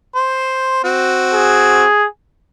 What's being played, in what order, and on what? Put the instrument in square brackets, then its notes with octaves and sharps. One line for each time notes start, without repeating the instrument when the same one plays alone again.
[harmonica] C5
C4 F#4
[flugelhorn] G#4